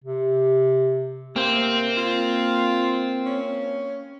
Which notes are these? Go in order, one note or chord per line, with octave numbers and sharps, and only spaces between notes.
C3
C3 A#3 C4 C5
F4
C#4